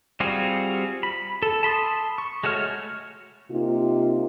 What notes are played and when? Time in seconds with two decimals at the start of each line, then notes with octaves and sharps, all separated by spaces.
0.20 G3 C4 F4 F#4 G#4
1.03 B5
1.43 A4
1.63 A5 B5 C6 D#6
2.18 C#6
2.44 G#3 A3 F#4 C#5 F6
3.50 C3 A#3 D#4 F4